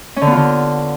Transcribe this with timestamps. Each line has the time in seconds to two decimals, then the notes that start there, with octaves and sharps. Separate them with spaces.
0.16 C#4
0.22 D3
0.27 B3
0.32 F4
0.37 D3